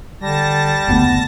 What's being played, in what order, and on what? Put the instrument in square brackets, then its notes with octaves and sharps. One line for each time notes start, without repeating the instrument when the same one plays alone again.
[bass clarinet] D3 [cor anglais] G3 [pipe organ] A5 A#6
[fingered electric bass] F#1 D2 A3 [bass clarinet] B3